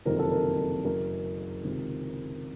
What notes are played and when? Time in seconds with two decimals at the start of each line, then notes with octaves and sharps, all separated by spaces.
0.05 F#1 F2 C3 D#3 A#4
0.19 A4
0.32 A#4
0.84 F#1 F#2 C#3 A#4
1.63 C#2 C3 D#3